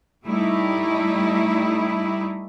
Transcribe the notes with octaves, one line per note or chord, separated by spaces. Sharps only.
G3 A3 D#4 E4